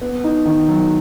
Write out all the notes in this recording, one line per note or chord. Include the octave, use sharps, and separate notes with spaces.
B3
D#4
D#3
F#3